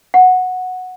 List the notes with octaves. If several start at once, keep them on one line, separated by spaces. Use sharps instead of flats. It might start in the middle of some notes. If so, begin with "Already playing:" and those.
F#5